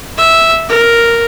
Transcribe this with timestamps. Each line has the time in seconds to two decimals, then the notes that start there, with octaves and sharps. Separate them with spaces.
0.18 E5
0.69 A#4